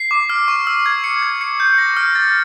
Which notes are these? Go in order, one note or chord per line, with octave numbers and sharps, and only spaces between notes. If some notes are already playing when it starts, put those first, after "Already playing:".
Already playing: C7
D6
F6
C#6
E6
G#6
C#7
G#6
C#7
G6
A#6
F6
A6